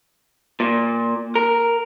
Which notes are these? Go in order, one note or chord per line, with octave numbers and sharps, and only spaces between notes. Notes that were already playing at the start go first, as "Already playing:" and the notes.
A#2
A#4